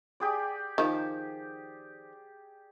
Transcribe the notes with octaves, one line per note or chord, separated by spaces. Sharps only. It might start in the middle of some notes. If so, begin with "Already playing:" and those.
G4 G#4 D5
D#3 F3